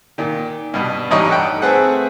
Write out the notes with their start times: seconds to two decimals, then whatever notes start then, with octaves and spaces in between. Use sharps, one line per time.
0.18 A#2 D#3
0.74 G2 B2
1.11 A1 G2 D#4 C#5 D#5 A#5
1.29 A4 F#5 G5
1.62 A3 C4 G#4 B4 F#5